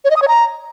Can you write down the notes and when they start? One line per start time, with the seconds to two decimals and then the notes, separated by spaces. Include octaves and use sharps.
0.05 C#5
0.10 D#5
0.16 D#6
0.22 C#5
0.28 A#5